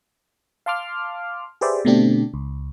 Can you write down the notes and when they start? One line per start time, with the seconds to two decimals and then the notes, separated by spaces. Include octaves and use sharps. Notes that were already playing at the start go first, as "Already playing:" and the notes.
0.66 F5 A5 C6 D6 F6
1.61 G4 G#4 B4 C5 D5 E5
1.85 B2 D3 A3 C4 D4 G4
2.34 C#2